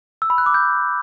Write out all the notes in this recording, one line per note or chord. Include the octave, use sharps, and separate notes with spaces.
E6
B5
F#6
D6
G6